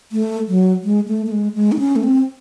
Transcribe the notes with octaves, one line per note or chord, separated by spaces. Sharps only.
A3
F#3
G#3
A3
A3
G#3
G#3
D#4
C#4
A3
C4